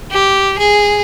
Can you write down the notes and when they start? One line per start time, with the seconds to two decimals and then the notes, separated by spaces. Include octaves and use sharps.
0.11 G4
0.58 G#4